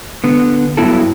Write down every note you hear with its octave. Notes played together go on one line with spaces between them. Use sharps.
D3 B3
G2 F#3 B3 E4 A4